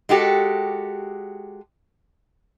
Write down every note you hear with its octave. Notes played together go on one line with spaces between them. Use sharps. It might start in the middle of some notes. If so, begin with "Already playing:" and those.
G#3 F#4 G4 A4